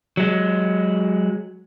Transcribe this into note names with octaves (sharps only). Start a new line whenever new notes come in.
F#3 G#3